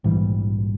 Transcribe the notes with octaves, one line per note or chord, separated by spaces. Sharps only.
A#1 G#2 E3 G3